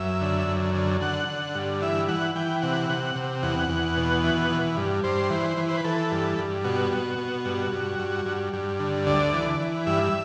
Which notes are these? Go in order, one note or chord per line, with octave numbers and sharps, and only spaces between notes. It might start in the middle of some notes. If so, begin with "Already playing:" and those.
Already playing: F#2 E5
D3
F#2
D3
D3 F#5
D3
G2
E3 E5
E3 F#5
E3 G5
C3 F#5
C3
C3
E2 F#5
E2
B2
E3
E3
G2
G2 C5
E3
E3
C5
B4
E3 A4
G2
G2
B2 F#4
B2
B2
G2
G2
G2
G2
G2
D3
D2 D5
E3
E3
G2 E5